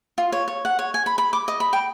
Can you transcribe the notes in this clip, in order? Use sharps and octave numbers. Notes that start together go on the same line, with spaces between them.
F4
C#5
C#5
F#5
C#5
G#5
B5
B5
D6
D#5
B5
G5